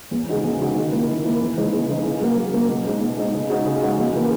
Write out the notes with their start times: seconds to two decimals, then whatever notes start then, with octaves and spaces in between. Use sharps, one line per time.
0.11 E2
0.28 C#3 G#3 D#4 F#4
0.44 E2
0.60 C#3 G#3 D#4 F#4
0.76 D#3
0.92 A#3 E4
1.08 D#3
1.25 A#3 E4
1.41 E2
1.57 C#3 E3 G#3 D#4
1.73 E2
1.89 C#3 E3 G#3 D#4
2.04 C#3
2.21 F#3 A#3
2.37 C#3
2.54 F#3 A#3
2.70 B2
2.85 G#3 D#4
3.01 B2
3.17 G#3 D#4
3.33 C#3
3.50 G#3 D#4 F#4
3.66 C#3
3.82 G#3 D#4 F#4
3.98 E2
4.13 C#3 E3 A#3